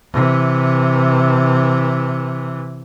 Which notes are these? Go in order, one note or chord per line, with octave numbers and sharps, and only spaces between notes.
C3 E3